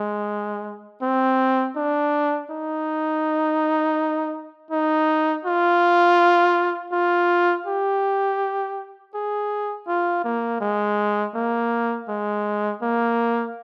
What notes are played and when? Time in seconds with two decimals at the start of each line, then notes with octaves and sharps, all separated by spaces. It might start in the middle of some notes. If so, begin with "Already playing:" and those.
Already playing: G#3
1.02 C4
1.77 D4
2.51 D#4
4.71 D#4
5.45 F4
6.92 F4
7.66 G4
9.15 G#4
9.88 F4
10.25 A#3
10.61 G#3
11.35 A#3
12.09 G#3
12.82 A#3